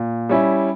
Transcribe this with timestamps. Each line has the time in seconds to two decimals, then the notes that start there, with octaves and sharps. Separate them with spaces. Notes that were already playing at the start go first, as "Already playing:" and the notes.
Already playing: A#2
0.29 G3 C#4 E4